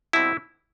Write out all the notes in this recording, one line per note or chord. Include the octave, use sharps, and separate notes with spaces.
B2 G3 C4 E4